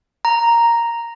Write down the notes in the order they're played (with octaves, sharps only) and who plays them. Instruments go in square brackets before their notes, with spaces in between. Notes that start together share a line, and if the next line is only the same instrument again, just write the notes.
[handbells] A#5